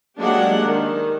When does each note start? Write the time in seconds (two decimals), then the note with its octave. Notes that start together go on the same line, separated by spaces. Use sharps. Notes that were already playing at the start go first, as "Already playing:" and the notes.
0.19 F#3 G#3 A#3 D4 G4 F#5
0.64 D#3